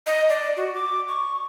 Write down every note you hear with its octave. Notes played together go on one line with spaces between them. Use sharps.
D#5
D5
F#4
D6
C#6